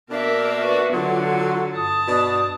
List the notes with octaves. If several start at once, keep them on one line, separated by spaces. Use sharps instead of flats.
B2 A#3 D4 A#4 E5
F#4 B4 E5
D3 F#3 F4 F#5
G2 A5 D#6
B2 D4